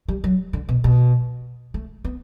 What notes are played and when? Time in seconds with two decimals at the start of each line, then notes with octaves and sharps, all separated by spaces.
0.08 G3
0.24 F#3
0.53 D3
0.69 B2
0.84 B2
1.74 A3
2.04 B3